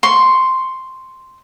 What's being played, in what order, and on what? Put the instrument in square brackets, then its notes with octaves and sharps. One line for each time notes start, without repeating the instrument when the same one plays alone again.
[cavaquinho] C6 C#6